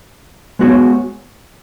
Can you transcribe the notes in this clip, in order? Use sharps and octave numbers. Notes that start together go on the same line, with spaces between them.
G#3 B3 F#4 C#5